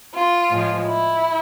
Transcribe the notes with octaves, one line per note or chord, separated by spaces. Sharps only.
F4
A2 F3 G#3
E4